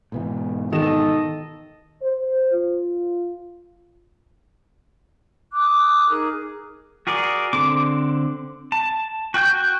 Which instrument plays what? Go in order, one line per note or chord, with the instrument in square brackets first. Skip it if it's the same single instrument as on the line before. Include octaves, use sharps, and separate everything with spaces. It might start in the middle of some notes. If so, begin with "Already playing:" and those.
[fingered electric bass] G#2 B2 E3
[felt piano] D#3 E7 [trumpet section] A4 D#5
[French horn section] C5
F4
[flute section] D6 D#6 F#6
D#4 G#4 A#4
[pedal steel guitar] F#4 G#4 A#4 D5
D3 C4 D6
A5
F#4 G5 F#6 G6